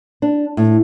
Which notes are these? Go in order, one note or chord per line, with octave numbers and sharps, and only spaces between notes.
D4
A2